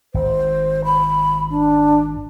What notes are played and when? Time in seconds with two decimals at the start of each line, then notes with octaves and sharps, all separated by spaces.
0.14 G#1 C5
0.85 B5
1.51 D4